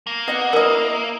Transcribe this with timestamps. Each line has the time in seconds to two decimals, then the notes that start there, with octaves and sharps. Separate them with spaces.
0.07 A#3
0.28 D#5 F#5
0.53 E4 A#4 D#5